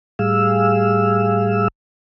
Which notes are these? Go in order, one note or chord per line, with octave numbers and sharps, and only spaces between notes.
A2 G3 G#4 F5 E6